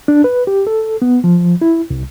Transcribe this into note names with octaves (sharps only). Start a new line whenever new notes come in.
D4
B4
G4
A4
B3
F3
E4
C2